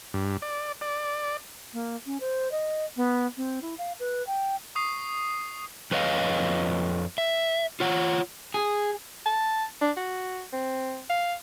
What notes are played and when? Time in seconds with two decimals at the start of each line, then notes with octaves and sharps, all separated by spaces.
0.14 G2
0.42 D5
0.81 D5
1.73 A#3
2.06 C#4
2.20 C5
2.51 D#5
2.96 B3
3.37 C4
3.62 E4
3.78 F5
4.00 B4
4.27 G5
4.75 C#6 D#6 C7
5.91 F2 B4 C#5 D#5 F5
7.18 E5
7.80 F4 C#5 F#5
8.54 G#4
9.26 A5
9.81 D4
9.97 F#4
10.53 C4
11.10 F5